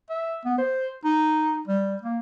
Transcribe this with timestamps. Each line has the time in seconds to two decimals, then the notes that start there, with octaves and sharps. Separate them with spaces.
0.10 E5
0.45 B3
0.58 C5
1.04 D#4
1.67 G3
2.02 A#3